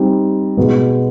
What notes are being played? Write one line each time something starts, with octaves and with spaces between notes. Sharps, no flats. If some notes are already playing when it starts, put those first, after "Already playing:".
Already playing: G3 C4 D#4 G4
B2 G#3 B3